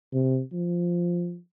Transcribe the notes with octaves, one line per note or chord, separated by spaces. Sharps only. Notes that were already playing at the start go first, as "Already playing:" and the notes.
C3
F3